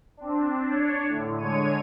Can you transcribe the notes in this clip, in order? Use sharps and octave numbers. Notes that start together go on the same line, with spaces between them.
C4 D4
D4 C#5
A2 D3
D3 G#3 C#5 D#7